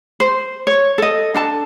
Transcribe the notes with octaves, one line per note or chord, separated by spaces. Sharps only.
C5
C#5
A4 D#5
D4 A4 A5